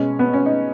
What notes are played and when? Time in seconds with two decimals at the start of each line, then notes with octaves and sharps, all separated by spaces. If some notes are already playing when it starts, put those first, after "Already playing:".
Already playing: B2 G#3 C#4
0.19 B3
0.33 C#4
0.46 D#4